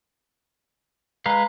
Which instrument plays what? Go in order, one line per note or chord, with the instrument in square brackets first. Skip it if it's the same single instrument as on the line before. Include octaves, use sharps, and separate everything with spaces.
[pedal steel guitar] G#3 B4 F5 [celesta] A#5